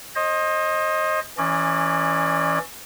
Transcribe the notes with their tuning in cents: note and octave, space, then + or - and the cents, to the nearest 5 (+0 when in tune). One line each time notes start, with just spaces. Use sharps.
C5 +35 D#5 +0
E3 +0 C#4 +0 D5 +35